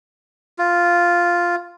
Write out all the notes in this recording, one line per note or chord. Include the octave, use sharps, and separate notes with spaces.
F4